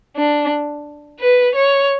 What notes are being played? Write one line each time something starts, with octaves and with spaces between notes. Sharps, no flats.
D4
B4
C#5